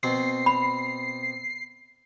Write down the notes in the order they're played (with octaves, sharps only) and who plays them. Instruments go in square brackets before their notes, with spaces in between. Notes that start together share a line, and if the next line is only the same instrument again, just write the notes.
[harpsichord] B2 C4 [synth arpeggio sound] C7
[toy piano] B5